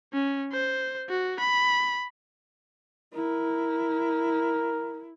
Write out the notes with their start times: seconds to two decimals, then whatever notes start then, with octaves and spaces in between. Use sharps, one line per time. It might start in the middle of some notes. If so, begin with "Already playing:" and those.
0.13 C#4
0.53 C5
1.09 F#4
1.40 B5
3.14 E4 A#4